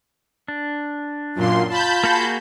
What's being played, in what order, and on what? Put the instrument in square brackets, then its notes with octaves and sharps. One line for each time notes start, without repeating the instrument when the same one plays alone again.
[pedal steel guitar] D4
[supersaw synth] F#2 A#2 C6 [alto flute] F4
[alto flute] F4 [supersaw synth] A5 B5 G6
[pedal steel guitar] A#3 F#4 G#4